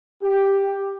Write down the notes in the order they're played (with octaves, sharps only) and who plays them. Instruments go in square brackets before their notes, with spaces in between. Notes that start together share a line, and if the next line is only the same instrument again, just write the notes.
[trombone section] G4